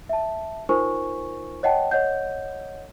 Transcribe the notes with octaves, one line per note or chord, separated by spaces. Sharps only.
E5 A5
D#4 F4 A#4 C5 G#5 C#6
C#5 D#5 F#5 G5 A5
C#5 D#5 F#5 G6